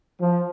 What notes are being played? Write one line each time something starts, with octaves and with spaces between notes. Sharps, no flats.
F3